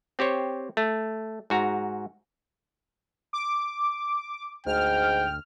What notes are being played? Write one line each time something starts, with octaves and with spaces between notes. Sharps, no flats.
C4 G4 C5 C#5
A3
G#2 F#4 A#5
D6
D2 G#2 G5 F6